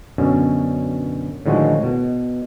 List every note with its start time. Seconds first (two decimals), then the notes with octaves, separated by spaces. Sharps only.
0.18 F#2 B2 D3 C#4
1.46 A2 D3 D#3 F3 G#3 F#4
1.83 B2